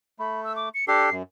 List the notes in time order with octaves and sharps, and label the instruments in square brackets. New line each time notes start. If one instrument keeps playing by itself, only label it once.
[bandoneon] A3 [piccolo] B5
[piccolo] E6
D6
C#7
[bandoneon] D4 G4 A4 [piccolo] C7
[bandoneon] F#2